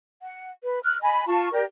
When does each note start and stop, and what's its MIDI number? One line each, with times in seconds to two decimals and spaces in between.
0.22 0.50 78
0.64 0.80 71
0.84 0.98 89
0.84 0.98 90
1.01 1.25 75
1.01 1.25 80
1.01 1.25 83
1.27 1.49 65
1.27 1.49 77
1.27 1.49 81
1.27 1.49 85
1.53 1.63 67
1.53 1.63 70
1.53 1.63 74